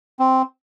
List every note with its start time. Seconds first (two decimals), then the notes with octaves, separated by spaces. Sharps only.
0.19 C4